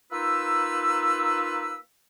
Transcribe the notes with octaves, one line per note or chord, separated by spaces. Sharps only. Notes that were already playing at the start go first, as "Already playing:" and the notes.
A#3 D#4 F4 B4 E6